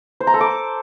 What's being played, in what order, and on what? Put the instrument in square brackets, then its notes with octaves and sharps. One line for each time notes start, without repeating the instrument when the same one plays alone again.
[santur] C5
A#5
A4
D6